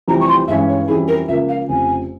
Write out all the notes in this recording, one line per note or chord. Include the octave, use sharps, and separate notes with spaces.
F1 F2 E3 G3 A#5
C#6
C6
G2 E3 G#3 C#4 E5
C#5
F2 E3 G3 C#4 E4 G#4
A#4
C#2 C#3 F3 A#3 E5
F5
F1 F2 C#3 G#5